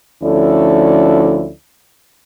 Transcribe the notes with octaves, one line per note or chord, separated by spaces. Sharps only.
D2 F3 C#4 E4 A4 D5